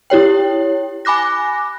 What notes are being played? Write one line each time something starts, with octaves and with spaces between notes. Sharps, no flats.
E4 G4 C#5 G5
G#5 B5 D6 F#6 A#6